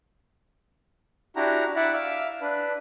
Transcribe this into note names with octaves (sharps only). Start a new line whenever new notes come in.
D4 E4 F#4 G4 A#5
E4 D5 E5 F#5
E5 F5 D6 E6
D4 B4